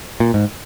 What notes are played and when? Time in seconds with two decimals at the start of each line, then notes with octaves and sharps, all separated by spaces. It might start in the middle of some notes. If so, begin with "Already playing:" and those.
0.20 A#2
0.34 G#2